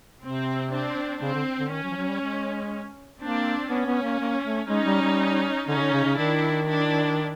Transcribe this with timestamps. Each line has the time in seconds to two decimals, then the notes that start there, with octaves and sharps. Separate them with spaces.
0.22 C3 C4
0.72 C4 D4
1.21 C#3 C4
1.34 D3
1.59 D3
1.71 D#3 C#4
1.84 F#3
1.91 F3
1.96 F#3
2.08 G3
2.21 G#3
3.20 A#3 C4 D4
3.69 B3 C#4
3.86 B3
4.03 A#3
4.19 A#3
4.44 A3
4.68 G#3 C#4 D#4
4.86 G3
5.02 G3
5.67 D3 C#4 D#4
5.76 C#3
5.81 D3
5.93 C#3
6.05 C#3
6.17 D#3 D4 E4
6.67 D4 E4